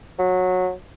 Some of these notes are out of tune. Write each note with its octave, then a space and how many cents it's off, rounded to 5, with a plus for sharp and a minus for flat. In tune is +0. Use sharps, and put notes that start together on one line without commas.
F#3 -15